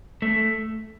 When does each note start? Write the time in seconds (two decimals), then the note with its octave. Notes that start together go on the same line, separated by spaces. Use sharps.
0.22 A3